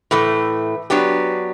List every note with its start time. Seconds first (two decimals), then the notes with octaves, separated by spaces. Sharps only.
0.11 A2 E3 A3
0.90 F#3 B3 D4 G4